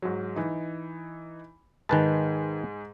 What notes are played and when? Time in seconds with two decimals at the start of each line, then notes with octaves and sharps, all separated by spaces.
0.02 G#2 F#3
0.36 E3 D#4
1.89 G#2 D#3 B4 G#5 A5